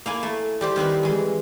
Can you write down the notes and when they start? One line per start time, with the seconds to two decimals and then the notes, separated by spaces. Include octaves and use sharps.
0.06 A#3 E4 G#5
0.23 A3
0.61 G3 G4 C5
0.76 D#3 C4 E4 B4
1.03 E3 G#3